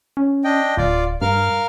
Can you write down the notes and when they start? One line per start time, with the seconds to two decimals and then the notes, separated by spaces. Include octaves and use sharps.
0.17 C#4
0.44 D4 D#5 G5
0.77 D1 F4 D5
1.22 G2 A#4 F5 F6